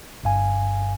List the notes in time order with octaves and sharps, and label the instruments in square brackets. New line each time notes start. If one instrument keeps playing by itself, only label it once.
[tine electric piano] G1 G2 F5 G#5